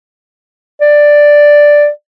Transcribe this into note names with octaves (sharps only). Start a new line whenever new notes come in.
D5